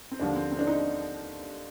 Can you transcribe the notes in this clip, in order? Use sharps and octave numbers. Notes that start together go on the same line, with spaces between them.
C4
D#2 D3 F3 D4
C4
C4
D4
D#4